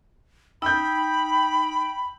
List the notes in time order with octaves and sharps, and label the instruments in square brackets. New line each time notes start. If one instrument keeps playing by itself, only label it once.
[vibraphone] D#4 [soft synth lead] G5 [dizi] B5 [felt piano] E6 G6